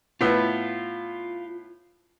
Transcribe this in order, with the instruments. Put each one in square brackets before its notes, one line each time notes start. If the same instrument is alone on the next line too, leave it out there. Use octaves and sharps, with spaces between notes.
[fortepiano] A2 B3 E4 [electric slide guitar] F4